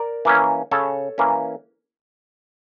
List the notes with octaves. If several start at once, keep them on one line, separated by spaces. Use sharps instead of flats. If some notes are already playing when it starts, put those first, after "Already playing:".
Already playing: A#4 D5
E3 A#3 C#4
C#3 A4 C#5
E3 A#3 C#4